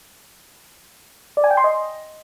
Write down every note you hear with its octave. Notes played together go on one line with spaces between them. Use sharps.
D5
G#5
G5
C6
D#5